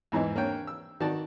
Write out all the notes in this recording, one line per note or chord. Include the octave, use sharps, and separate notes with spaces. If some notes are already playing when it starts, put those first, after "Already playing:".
E2 G#2 E3 D#4
A#3 D4 C#5 G5
E6
D#3 F#4 D5 A5